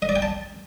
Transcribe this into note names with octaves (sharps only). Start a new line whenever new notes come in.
D#5
D5
G5
A5